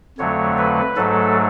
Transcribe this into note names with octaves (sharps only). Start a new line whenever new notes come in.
F2 D3 F#3 A3 C#5
B4
G#2 F#3 A3 A4